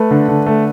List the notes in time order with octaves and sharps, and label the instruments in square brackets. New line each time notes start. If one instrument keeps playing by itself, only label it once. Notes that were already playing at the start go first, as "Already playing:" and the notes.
Already playing: [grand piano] A3 B4
D3
D3
A3